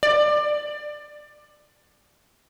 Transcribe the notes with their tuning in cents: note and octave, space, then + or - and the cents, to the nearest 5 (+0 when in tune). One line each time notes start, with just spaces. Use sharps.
D5 +25